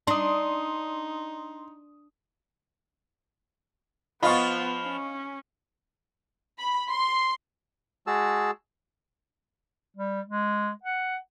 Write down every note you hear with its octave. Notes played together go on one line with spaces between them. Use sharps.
D4 D#4 C6 D#6
F3 B3 F4 D#5 F5 B5 C#6
C#4
B5
C6
G#3 F#4 G#4 A5 E6
G3
G#3
F#5